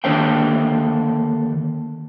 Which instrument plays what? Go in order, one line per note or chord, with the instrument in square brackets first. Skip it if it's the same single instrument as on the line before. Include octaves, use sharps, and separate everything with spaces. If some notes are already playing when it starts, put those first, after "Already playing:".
[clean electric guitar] D#2 D3 C5 E5 G5